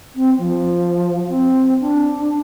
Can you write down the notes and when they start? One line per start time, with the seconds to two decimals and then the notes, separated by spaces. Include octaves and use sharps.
0.16 C4
0.39 F3
1.28 C4
1.80 D4